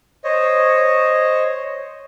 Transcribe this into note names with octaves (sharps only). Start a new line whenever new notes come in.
C5 C#5 D#5